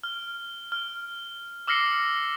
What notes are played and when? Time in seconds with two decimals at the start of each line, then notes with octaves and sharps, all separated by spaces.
0.04 F6
0.72 F6
1.68 D6 E6 F6 A#6 C7 C#7